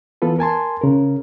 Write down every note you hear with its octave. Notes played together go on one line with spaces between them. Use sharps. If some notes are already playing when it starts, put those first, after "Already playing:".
E3 B3 F4 A4 B4
A#4 G#5 A5 C6
C#3 A#4